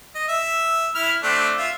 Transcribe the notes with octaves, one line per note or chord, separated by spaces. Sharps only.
D#5
E5
E4 F6
A3 C4 D4
F4 E5